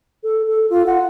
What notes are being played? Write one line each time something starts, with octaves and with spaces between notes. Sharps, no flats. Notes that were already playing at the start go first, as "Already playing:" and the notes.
A4
A4
F4
F#5